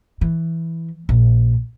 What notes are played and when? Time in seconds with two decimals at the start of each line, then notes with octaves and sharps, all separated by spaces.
0.21 E3
1.09 A#1